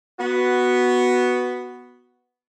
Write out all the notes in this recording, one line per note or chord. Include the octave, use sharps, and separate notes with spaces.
B3 F#4